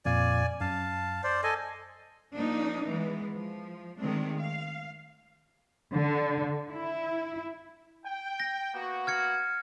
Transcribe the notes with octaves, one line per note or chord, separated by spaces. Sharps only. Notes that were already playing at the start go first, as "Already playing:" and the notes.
F2 A#2 D5 F5 G#5
F#2 F5 A5
C5 D5
A4 D#5 G#5
F3 A#3 D4 D#4
E3 G#3 B3
F3
D#3 G#3 A3 C4 D4
F5
D3
E4
G5
A#6
A#3 B3 F#4
F6 G#6 C#7